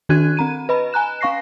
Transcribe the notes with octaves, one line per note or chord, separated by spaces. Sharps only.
D#3 D4 F#4 F#6 G#6 D#7
C4 A#5 D#7
B4 D#5 B5
G#5 A#5 F#6 E7
C#4 F5 C#6 A#6 C7